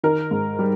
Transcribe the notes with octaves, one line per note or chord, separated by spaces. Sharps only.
D#3 A#4
G#2
G3